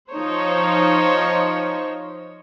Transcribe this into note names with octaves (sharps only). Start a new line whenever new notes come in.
F3 D#4 C5 C#5